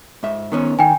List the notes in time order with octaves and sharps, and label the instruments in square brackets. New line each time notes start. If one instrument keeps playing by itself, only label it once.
[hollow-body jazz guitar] G#2 E5
D#3 B3 C#4
[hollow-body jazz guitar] D#3 [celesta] G5 G#5